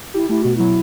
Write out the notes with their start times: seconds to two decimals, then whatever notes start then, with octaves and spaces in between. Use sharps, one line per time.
0.14 E4 G4
0.29 A3 E4
0.42 B2 F#4
0.56 F#3 E4